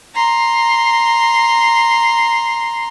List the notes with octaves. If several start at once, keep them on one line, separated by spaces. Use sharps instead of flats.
A#5 C6